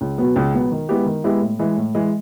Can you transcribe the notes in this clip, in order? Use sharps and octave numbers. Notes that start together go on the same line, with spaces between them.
C#2
B2 F#3 B3
C#2
B2 F#3 B3
D#3
G#3 B3 E4 G4
D#3
G#3 B3 E4 G4
A2
E3 G#3
A2
E3 G#3